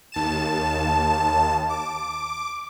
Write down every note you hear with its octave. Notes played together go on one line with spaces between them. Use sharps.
D#2 A5 E7
D6